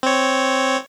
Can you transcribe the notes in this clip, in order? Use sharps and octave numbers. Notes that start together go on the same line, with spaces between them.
C4 C#5